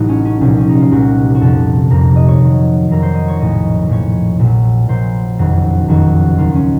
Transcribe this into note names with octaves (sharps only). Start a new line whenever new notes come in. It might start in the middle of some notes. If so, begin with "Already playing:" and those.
Already playing: A1 A2 F#3 D#4 F#4
C#4
C#4
C2 A#2 F3 C#4
C#4
D#4
F4
C2 A#2 F3 F#4
F#4
F2 C3 F3 A4
F2 C3 F3 A#4
D#5
C#5
F2 D#3 F#3
F2 D#3 F#3 A#4
C5
D#5
C#5
A#1 A2 F3 D#5
A#1 A2 F3 C#5
A#1 A#2 F#3
A#1 A#2 F#3 C5
F#1 F2 D#3 F#3
F#1 F2 D#3 F#3 F#4
D#2 D#3 F#3 F4
C#4